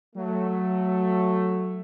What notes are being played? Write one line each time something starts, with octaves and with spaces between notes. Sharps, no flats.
F#3 A3